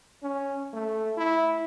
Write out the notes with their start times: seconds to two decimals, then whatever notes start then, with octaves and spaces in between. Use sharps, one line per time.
0.23 C#4
0.74 A3
1.18 E4